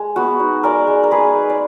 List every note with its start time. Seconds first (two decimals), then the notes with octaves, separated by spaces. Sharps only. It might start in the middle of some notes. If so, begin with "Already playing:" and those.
Already playing: G#3
0.16 B3 F#4
0.40 D#4
0.63 G#3 A#4 D5
0.87 G#3
1.03 A#4
1.11 B3 G#4 B4
1.35 D#4
1.50 D5